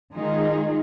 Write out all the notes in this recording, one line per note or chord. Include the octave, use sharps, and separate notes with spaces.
D#3 G#3 D#4 F4 G#4